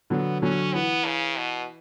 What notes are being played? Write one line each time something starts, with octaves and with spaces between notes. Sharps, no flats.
D3 F#3 B3
D3 F#3 C#4
E3 B3
C#3
B2